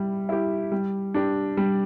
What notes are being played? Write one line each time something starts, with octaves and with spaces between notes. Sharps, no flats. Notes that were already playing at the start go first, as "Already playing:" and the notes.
Already playing: G3 E4
E4 G4
G3
D4 G4
G3